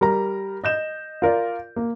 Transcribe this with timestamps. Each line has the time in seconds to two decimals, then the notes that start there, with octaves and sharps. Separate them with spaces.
0.01 G3 A#4 A#5
0.64 D#5 G6 E7
1.22 F4 A#4 D5
1.76 A#3